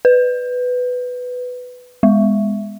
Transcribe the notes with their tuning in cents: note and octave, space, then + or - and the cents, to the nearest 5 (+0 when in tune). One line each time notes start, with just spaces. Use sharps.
B4 +10
G#3 -15